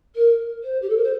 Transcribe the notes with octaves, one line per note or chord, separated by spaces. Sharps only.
A#4
C5
G4
A4
A#4
C5